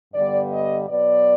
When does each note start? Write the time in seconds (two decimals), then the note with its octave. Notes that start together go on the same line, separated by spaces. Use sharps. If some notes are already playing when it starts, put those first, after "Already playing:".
0.14 G2 D3 G3 B3 D5
0.51 D#5
0.88 B2 F#3 B3 D5